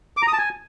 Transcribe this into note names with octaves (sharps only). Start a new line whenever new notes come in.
D6
A#5
D#6
A5
G#5